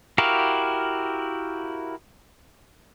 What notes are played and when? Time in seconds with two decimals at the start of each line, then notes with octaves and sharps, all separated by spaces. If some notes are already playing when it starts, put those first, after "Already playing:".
0.18 E4 F#4 G4 A#4 F5